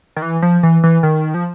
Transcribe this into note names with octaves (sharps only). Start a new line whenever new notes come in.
D#3
E3
F3
E3
E3
D#3
F3